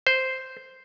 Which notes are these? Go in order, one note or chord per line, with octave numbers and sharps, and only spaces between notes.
C5